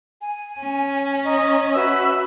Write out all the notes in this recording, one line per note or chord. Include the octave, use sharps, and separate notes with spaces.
G#5
C#4
D#5 A#5
F#4 B4 E5 E6